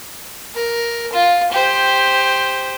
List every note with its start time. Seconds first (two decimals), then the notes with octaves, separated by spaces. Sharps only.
0.55 A#4
1.13 F4
1.52 G4 C5